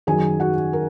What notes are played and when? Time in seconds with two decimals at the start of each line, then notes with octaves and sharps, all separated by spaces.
0.07 F#1 F#2 D#3 F#3 G#4 G#5
0.40 F#4 F#5
0.73 A#4